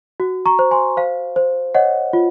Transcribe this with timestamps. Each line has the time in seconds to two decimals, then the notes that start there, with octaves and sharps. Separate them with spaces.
0.20 F#4
0.46 A#5 C#6
0.59 C5
0.71 G#5 C6
0.97 C5 F5
1.36 C5
1.75 C#5 D#5 F#5
2.13 F4